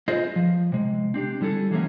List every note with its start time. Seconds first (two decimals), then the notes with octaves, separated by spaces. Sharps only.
0.08 F4 G#4 B4 C5 D#5
0.36 F3
0.72 C3 G#3
1.14 C4 D4 G4
1.41 D3 G3 E4 G#4 A4
1.71 E3 F#3 G#3 A#3 C#4 E4